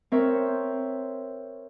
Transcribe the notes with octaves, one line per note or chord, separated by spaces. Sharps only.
C4 A#4 C5 C#5 E5